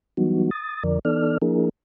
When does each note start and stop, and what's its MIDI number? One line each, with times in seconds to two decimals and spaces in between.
0.17 0.50 52
0.17 0.50 54
0.17 0.50 55
0.17 0.50 59
0.17 0.50 63
0.17 0.50 66
0.51 0.83 87
0.51 0.83 93
0.84 0.99 41
0.84 0.99 50
0.84 0.99 53
0.84 0.99 70
0.84 0.99 74
1.05 1.38 52
1.05 1.38 59
1.05 1.38 63
1.05 1.38 69
1.05 1.38 74
1.05 1.38 89
1.42 1.69 53
1.42 1.69 58
1.42 1.69 62
1.42 1.69 64
1.42 1.69 68
1.42 1.69 70